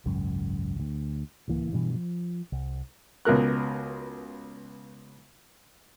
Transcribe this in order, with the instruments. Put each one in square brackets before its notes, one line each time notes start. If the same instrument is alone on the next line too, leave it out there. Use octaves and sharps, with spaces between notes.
[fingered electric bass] G#1 C#2 F#2
D2
D1 C#2 E3 A#3
G2 B2 E3
F3
C2
[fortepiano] C#2 B2 A#4 F#6